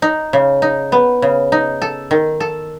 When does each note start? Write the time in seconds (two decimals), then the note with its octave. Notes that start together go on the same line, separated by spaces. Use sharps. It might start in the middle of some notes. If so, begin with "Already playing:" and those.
0.02 D#4
0.33 C#3
0.62 D#4
0.92 B3
1.22 C#3
1.52 D#4
1.82 A4
2.11 D#3
2.40 A4